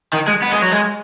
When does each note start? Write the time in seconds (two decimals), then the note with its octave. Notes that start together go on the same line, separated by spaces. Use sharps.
0.14 D#3
0.28 G#3
0.42 B3
0.52 G#3
0.62 F#3
0.72 G#3